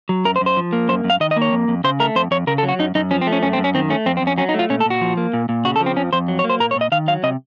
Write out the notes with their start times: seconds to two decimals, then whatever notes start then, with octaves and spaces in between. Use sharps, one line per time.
0.09 F#3
0.25 F#2 A#4
0.36 C5
0.41 F#2
0.46 C5
0.57 F3
0.73 A#3
0.89 F#2 C5
1.04 F#2
1.10 F5
1.20 D#3 D#5
1.31 D#5
1.36 A#3
1.42 C#5
1.52 F2
1.68 F2
1.84 C#3 C5
2.00 A3 A#4
2.16 F2 C5
2.31 F2 C#5
2.47 C#3 A#4
2.58 A4
2.63 F#3
2.69 F#4
2.79 F#2 D#4
2.95 F#2 D#4
3.11 F3 C#4
3.21 C4
3.27 A3
3.32 C#4
3.43 F#2 C#4
3.53 C4
3.58 F#2
3.64 C#4
3.74 D#3 C4
3.90 A3 C#4
4.06 F2 C4
4.17 C4
4.22 F2
4.27 C#4
4.38 F#3 C#4
4.49 D#4
4.54 A3 F4
4.70 A#2 C#4
4.80 A4
4.85 A#2 F#4
5.01 F3
5.17 A#3
5.34 A#2
5.49 A#2
5.65 C#3 F#4
5.76 A4
5.80 F3
5.86 C4
5.96 F2 C#4
6.13 F2 C5
6.28 F#3
6.39 C#5
6.44 A#3
6.50 C5
6.60 A#2 A#4
6.71 C#5
6.76 A#2
6.81 D#5
6.92 D#3 F5
7.08 F#3 F5
7.23 C3 D#5